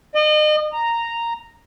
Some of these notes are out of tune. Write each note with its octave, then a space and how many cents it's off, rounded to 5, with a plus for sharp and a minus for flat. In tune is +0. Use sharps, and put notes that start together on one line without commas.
D#5 -35
A#5 -5